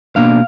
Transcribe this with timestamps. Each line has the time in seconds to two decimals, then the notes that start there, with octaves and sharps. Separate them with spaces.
0.16 B2 A#3 D4 F5